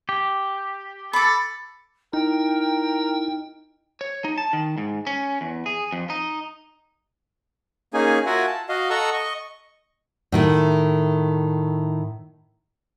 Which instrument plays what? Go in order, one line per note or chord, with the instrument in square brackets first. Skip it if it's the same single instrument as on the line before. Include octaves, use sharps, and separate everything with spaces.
[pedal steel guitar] G4
[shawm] A4 [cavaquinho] B5 D6
[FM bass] D#4 [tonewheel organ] E4 [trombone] A#4 [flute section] G5
[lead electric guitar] C#5
D#4
A5
D#3
G#2
C#4
E2
G#4
F2
D#4
[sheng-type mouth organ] A#3 C#4 D#4 G#4 G#5
F4 F#4 A#4 E5 F#5 G#5
A5
F#4 D#5 F5
A4 D#5 F#5 A#5 C#6 E6
D#5 C#6
[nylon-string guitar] A2 D#3 A3